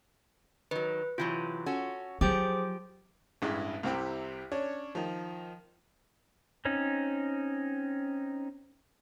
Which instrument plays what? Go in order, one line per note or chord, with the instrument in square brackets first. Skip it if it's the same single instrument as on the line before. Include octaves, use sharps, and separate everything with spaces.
[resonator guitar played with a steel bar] D#3 F#3 [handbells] B4
[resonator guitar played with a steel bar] C3 E3 F#3 [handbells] F4
[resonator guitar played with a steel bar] C#4 F#4 A4
[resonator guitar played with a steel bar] F3 G4 [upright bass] F#3 [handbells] G#4 C5 D6
[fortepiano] A1 G2 G#3 E4
C2 C3 C4 E4 G4
C#4 D4 C#5
D#3 F3
[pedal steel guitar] C4 C#4 D#4